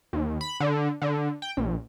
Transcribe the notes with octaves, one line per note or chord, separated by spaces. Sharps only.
D#2
B5
D3
D3
G5
A#1